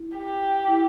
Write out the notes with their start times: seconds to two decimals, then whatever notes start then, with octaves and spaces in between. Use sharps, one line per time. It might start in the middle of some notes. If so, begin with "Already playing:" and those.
Already playing: E4
0.17 G4
0.68 E4